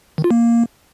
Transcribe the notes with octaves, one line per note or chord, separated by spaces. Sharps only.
D#3
F4
A#3